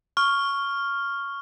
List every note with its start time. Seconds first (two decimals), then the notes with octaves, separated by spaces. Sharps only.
0.17 C#6 F6